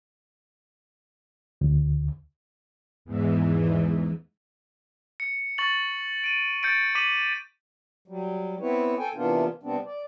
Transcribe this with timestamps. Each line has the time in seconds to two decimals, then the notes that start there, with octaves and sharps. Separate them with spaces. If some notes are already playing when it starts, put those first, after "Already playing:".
1.61 D2
3.05 E2 G#2 E3
5.20 C#7
5.58 C#6 A6 F#7
6.24 D7 D#7
6.63 G6 A6 C#7 D7
6.95 D6 B6 D#7 F#7
8.08 F#3 G3
8.60 B3 C4 E4 B4 C#5
8.99 A4 G5 G#5
9.15 C3 E3 A#3 B3 D4 F4
9.63 C3 G3 B3 C4 D4
9.85 D5